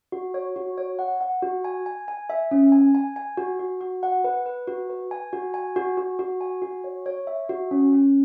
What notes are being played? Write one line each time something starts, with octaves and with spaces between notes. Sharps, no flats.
F#4
C#5
F#4
C#5
F#5
F#5
F#4
G#5
G#5
G#5
E5
C#4
G#5
G#5
G#5
F#4
F#4
F#4
F#5
B4
B4
F#4
B4
G#5
F#4
G#5
F#4
F#4
F#4
G#5
F#4
C#5
C#5
E5
F#4
C#4
C#4